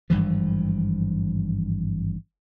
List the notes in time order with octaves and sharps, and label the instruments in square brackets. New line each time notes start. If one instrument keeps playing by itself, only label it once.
[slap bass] G#1 G2 E3 F3